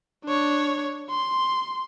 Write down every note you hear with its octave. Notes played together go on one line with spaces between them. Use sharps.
D4 C#5
C6